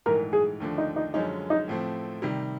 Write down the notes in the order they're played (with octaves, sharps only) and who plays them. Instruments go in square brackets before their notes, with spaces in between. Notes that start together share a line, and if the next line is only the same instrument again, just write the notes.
[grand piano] A#1 G#2 E3 A3 [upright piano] A#4
[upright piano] G#4
[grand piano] D#2 D3 F3 A3 D4
[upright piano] D#4
D#4
[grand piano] F#2 D3 F3 G#3 C#4 [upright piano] D#4
[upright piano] D#4
[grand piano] A2 F3 A3 C4
C3 D#3 G3